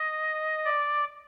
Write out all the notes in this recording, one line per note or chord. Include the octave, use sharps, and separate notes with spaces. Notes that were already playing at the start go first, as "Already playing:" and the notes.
Already playing: D#5
D5